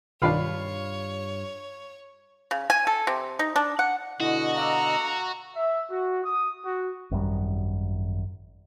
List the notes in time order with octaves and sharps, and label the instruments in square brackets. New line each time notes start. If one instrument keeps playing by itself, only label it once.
[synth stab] B1 D#3 D4 [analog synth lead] G2 [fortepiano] F4 F5 B5 [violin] C#5
[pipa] C#3
G#5
A4
C3
D#4
D4
F#5
[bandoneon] B2 D3 D#5 [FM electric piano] E4 [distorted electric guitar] F#4
[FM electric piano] F5 D6 E6 [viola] A#5
[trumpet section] E5
F#4
D#6
F#4
[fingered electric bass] G#1 F#2 D#3 G3